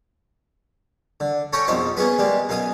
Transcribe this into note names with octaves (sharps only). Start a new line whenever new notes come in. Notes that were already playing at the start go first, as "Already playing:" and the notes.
D3
C#4 A4 C#5 F#5 G5 A#5
A#1 F2 B2 D#4 C5 F5
A#3 B3 C#4 G#4 B4
G3 G#3 A#3
F#2 B2 F5 G#5 D#6